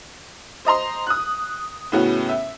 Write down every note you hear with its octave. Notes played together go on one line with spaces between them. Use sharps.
C5 D#5 A#5 C6
D#6 F#6
A2 C#3 B3 C#4 F#4
E5